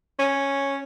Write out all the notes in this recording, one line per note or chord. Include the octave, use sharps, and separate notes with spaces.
C#4